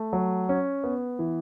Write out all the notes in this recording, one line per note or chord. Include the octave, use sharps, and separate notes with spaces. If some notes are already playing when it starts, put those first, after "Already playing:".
Already playing: A3
F#3
C#4
B3
E3